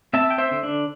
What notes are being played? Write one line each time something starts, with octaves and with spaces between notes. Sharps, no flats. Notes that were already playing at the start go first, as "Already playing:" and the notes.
C4 E5 A5
G5
C5 E5
D3
D4